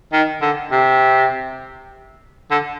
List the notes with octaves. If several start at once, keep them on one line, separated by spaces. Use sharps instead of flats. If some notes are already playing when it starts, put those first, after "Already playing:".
D#3
D3
C3
D3